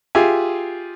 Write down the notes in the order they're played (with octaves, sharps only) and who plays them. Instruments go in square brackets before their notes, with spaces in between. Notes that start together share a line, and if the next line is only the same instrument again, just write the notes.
[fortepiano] F4 G4 G#4 E5 G#5